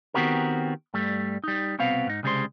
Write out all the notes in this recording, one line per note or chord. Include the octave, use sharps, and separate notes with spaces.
D#3 B3 C4 F#4 G4 A#4
G2 G3 A3
G3 D#4
C2 B2 B3 C4 F5
G#2 D#4
C2 C#3 G3 G#3 C5 C6